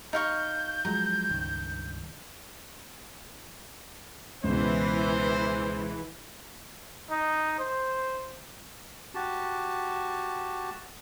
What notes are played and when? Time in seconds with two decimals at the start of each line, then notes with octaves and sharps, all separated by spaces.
0.13 D#4 F5 C#6 G6
0.85 F3 F#3 G#3 A#5
1.30 C#2 G2 D#3
4.44 C#2 B2 E3 C5
7.11 D#4
7.60 C5
9.15 F#4 G4 A5